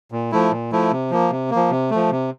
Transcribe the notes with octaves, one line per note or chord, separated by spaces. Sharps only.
A#2
F3 A3 E4
A#2
F3 A3 E4
C3
F3 A#3
C3
A#3
F3
C3
F3 A3
C3